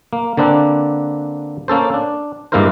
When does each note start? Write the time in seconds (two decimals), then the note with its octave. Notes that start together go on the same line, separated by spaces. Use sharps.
0.13 A#3
0.37 D3 A#3 C4 D4 B4
1.68 A#3 C#4 A4 C5
1.94 D4
2.52 G2 G#3 A#3 E4 A#4 C5